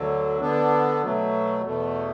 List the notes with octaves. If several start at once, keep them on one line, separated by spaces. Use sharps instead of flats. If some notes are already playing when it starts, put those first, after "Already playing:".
Already playing: D2 D3 F#3
D3 B3 D4
B2 F#3 A3
E2 B2 A3